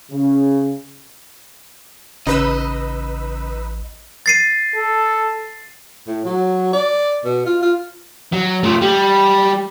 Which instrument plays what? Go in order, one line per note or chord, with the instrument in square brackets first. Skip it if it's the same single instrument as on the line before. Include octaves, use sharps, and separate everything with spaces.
[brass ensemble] C#3
[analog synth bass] A1 [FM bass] C#3 [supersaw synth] D#4 B4 E6 [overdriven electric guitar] D#5
[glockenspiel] A6 C7 D#7
[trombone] A4
[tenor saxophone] A2
F#3
D5
B2
F4
F4
[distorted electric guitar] F#3
A3 F4
G3